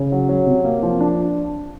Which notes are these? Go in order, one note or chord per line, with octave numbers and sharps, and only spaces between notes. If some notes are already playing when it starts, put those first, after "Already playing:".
Already playing: C#3
F#3
F#3
C3
A#3
F3
D4